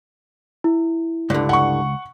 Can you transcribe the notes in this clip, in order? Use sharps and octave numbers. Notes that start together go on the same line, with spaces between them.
E4
C#2 G2 D3
F#5 C#6